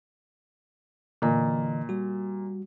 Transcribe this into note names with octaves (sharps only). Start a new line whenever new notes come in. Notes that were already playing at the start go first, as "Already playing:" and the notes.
A#2 D3 E3 D#5
G3 F#4